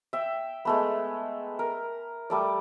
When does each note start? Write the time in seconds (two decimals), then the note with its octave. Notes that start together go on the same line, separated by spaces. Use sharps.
0.13 E5 G5
0.65 G#3 A3 B3
1.59 A#4
2.30 G3 A3 D5